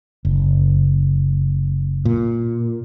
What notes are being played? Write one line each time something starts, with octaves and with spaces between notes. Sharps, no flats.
F#1
A#2